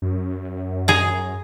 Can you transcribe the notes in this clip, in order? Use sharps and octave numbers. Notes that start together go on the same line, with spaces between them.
F#2
G#4 A#5